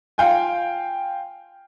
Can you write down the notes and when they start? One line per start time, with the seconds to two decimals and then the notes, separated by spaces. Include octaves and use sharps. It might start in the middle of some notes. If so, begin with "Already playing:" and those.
0.18 F4 F5 G5 G#5